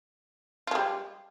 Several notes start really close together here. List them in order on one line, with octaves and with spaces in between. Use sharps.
F4 G#3 G3